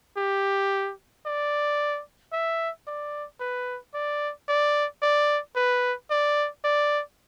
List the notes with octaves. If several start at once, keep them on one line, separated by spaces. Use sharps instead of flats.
G4
D5
E5
D5
B4
D5
D5
D5
B4
D5
D5